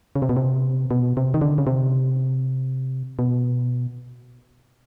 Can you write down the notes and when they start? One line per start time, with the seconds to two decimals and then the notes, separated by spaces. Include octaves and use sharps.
0.16 C#3
0.22 C3
0.29 B2
0.37 C3
0.91 B2
1.17 C3
1.34 D#3
1.41 D3
1.58 C#3
1.67 C3
3.19 B2